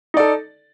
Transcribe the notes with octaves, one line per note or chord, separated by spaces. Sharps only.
D#4 A4 D5